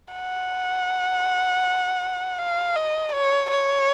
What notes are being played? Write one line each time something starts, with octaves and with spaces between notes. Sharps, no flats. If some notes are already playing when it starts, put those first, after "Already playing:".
F#5
F5
D#5
C#5
C#5